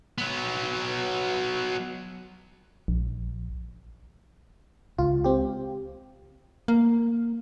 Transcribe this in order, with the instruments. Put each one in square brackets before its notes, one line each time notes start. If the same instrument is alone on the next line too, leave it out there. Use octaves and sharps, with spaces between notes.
[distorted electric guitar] F#3 B3
[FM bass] A#1
[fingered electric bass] C#2 [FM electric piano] F4
[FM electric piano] C4 G4
[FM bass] A#3